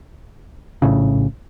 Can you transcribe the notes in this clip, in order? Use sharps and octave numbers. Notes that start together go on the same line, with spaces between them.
A#1 A2 C#3